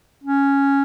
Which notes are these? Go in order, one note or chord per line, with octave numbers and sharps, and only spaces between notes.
C#4